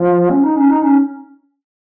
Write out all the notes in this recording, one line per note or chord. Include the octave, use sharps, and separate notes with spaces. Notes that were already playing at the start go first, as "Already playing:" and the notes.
Already playing: F3
C#4
D#4
C#4
D#4
C#4